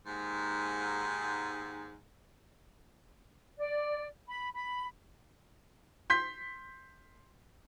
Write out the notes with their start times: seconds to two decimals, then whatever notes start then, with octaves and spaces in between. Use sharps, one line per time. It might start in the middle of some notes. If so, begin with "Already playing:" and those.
0.06 D#2 G#2
3.58 D5
4.27 B5
4.54 B5
6.10 C6 G6 B6